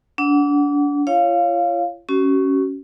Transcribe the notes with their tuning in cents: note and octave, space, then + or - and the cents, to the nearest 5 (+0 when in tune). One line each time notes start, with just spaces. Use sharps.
D4 -30 F#5 +0
F4 -45 C#5 +0 F5 +0
C#4 +0 F#4 +40